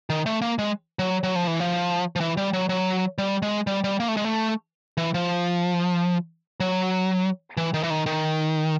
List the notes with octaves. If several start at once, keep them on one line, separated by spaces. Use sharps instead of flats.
D#3
A3
A#3
G#3
F#3
F#3
F3
E3
F3
F3
E3
G3
F#3
F#3
G3
G#3
G3
G3
A#3
A3
G#3
A3
E3
F3
F#3
E3
D#3
E3
D#3
D#3